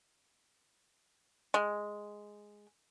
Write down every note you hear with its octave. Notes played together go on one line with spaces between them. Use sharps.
G#3